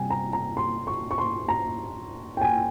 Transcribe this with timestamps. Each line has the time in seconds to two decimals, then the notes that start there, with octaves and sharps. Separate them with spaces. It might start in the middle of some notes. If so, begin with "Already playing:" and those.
Already playing: C3 G3 G5 G#5
0.10 A#5
0.33 A#5
0.57 C6
0.87 C#6
1.11 C#6
1.18 C6
1.49 A#5
2.37 G5
2.41 G#5